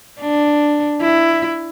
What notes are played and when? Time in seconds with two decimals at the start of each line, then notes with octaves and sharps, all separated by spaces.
0.20 D4
1.01 E4